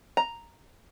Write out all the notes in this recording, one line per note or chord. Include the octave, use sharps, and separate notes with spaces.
A#5